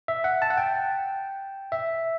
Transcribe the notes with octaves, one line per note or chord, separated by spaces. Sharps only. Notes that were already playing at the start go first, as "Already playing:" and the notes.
E5
F#5
A5
F#5
G5
E5